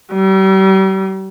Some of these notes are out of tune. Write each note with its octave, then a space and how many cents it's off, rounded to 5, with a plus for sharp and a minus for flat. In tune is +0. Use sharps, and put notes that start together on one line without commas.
G3 -40